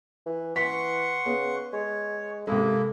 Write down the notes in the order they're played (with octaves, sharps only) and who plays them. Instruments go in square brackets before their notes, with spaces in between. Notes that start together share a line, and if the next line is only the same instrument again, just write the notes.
[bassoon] E3
[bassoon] E3 [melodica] F#5 C6 C#6 [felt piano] B6
[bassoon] C#3 [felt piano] B3
[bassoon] G#3 [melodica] C#5
[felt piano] C3 G#3 [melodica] A#3 E4 [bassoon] A4